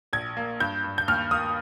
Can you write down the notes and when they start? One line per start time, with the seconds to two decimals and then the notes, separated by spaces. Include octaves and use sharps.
0.13 A#1 G#6
0.37 A#3
0.60 G2 G6
0.84 G2
0.98 G6
1.08 D#2 F6
1.31 A#3 D#6